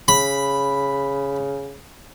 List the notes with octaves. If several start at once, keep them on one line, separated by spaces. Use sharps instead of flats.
C#3 B5